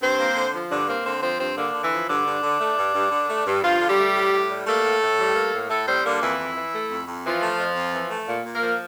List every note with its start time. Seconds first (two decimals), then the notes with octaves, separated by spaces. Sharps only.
0.02 G2 C4 C5
0.19 A#3
0.36 D3
0.54 F3
0.71 G2 D3 D4
0.88 A#3 C4
1.05 D3 C4
1.22 F3 C4
1.40 G2 C4
1.57 D3 A#3 D4
1.74 D3
1.83 E3 E4
1.92 F3
2.08 G2 D3 D4
2.26 G2
2.43 D3
2.60 A3
2.77 G2
2.95 G2
3.11 D3
3.29 A3
3.46 G2
3.63 G2 F3 F4
3.80 D3
3.89 G3 G4
3.98 A3
4.15 A2
4.32 A2
4.50 G3
4.67 A3 A#3 A4
4.84 A2
5.01 A2
5.18 G3
5.35 A#3
5.53 A2
5.69 A2 A3 A4
5.87 G3 C4 C5
6.05 D3 A#3 D4
6.21 F2 E3 E4
6.38 F2
6.55 E3
6.73 A3
6.90 F2
7.07 F2
7.25 E3 F3 F4
7.42 A3
7.59 F2
7.76 F2
7.94 E3
8.11 A3
8.28 A#2
8.45 A#2
8.54 A#3 A#4
8.62 F3